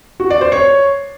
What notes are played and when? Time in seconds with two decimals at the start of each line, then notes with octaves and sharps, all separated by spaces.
0.20 F#4
0.30 D5
0.41 C5
0.52 C#5